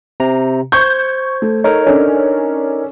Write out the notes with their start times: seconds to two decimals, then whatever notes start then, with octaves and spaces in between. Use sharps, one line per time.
0.20 C3 A#5
0.72 C5 C#6 G6 G#6
1.42 A3
1.64 D#4 A4 A#4 C#5
1.87 C#4 D4 A4